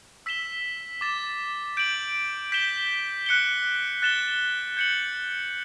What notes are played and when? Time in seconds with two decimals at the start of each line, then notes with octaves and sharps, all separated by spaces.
0.26 E6 B6 E7 G7
1.01 D6 A6 E7
1.77 G6 D7 F#7
2.52 G6 B6 E7 G7
3.26 F#6 C#7 G7
4.02 F#6 A6 E7 G7
4.77 G6 C#7 F#7